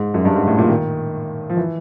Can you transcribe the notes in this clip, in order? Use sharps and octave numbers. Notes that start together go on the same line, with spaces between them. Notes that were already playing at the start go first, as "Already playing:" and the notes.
Already playing: G#2
F#2
G2
G#2
A2
A#2
D#3
F3
E3